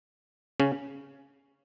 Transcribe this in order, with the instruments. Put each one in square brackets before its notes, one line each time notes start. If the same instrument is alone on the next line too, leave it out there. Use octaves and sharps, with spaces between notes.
[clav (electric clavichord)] C#3 C#4